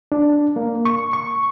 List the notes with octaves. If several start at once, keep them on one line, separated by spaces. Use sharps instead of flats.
D4
A#3
C#6
C#6